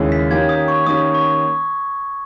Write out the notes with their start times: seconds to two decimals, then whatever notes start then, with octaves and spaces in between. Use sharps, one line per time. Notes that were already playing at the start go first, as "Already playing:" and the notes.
Already playing: D#2 C#3 G#3 C#4 E4
0.12 B6
0.31 D#3 A#3 C#4 G4 G#6
0.49 D#6
0.68 C#6
0.87 D#3 A#3 C#4 G4 D#6
1.15 C#6